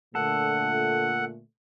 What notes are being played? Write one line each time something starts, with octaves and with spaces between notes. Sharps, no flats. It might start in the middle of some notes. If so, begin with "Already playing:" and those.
A#2 D3 A3 A4 F#5